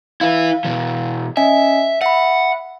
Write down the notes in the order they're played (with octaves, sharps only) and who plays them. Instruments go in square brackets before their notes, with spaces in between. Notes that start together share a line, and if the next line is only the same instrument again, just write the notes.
[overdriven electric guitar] E4 B4 [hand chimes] F5
[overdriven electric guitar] B2 E3
[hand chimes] C#4 D#5 G#5 [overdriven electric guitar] E5
[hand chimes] E5 B5 [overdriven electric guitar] F#5